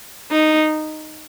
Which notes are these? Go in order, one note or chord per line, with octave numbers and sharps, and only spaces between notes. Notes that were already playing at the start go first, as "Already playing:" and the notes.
D#4